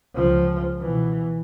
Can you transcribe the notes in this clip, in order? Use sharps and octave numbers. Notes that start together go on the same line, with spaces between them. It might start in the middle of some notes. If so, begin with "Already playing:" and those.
C#2 F3
B2 E3